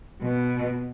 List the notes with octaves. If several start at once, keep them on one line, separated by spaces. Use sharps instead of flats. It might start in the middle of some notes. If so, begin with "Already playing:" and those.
B2